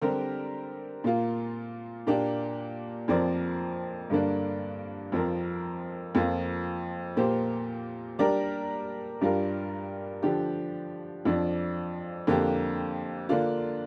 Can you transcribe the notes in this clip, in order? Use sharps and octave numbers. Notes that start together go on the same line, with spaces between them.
D3 G3 C4 G4 A#4
A#2 A#3 F4
A#2 A#3 D4 G4
F2 F3 C4 A#4 D5
G2 D3 A#3 D4
F2 F3 C4 A#4
F2 F3 A#3 F4
A#2 A#3 G4 C5
G3 D4 G4 A#4 D5
G2 G3 D4 F4 A#4
D3 F3 D4 G4
F2 F3 D4
F2 D3 A#3 G4
D3 A#3 D4 F4